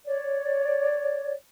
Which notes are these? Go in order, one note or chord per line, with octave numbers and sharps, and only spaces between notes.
C#5 D5